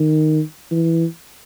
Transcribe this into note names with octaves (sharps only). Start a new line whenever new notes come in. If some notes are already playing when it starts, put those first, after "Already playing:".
Already playing: D#3
E3